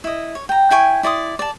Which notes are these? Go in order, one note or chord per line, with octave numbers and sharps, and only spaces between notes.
E4 D#5
C#5
G5 A#5
E4 G5 G#5 C#6
E4 D5 C6 D#6
D5 A5